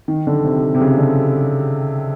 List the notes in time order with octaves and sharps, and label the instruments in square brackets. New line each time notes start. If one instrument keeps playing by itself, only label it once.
[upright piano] D#3
D3
C3
C3
C#3
D3